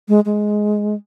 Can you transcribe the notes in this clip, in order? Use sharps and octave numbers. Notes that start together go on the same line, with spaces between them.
G#3
G#3